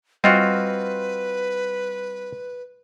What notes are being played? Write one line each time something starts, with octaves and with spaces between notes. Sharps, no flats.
G3 C4 F4 F#4 B4 D#5 C6